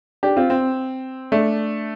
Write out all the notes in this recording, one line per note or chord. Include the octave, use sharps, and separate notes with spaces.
D4 G4
C4 F4
C4
A3 D4